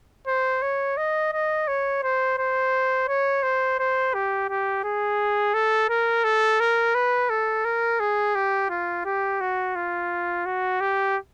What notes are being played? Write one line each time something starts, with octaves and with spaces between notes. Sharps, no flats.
C5
C#5
D#5
D#5
C#5
C5
C5
C#5
C5
C5
G4
G4
G#4
A4
A#4
A4
A#4
B4
A4
A#4
G#4
G4
F4
G4
F#4
F4
F#4
G4